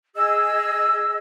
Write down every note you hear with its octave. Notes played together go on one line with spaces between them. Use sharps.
G#4 D#5 E6